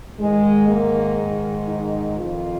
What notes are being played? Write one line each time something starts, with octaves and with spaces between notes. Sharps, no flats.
G#2 D#3 G#3
A#3
D#4
F2 D#3 F4